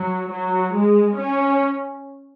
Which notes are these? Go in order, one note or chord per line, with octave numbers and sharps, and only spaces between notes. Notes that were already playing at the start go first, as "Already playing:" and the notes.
Already playing: F#3
F#3
G#3
C#4